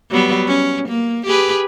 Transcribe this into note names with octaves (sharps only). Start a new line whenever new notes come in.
F#3 G3 B3
C#4
A#3
G4 G#4 B4